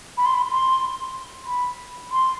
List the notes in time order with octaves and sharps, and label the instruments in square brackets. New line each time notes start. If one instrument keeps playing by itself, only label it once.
[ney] B5
C6
B5
C6
B5
C6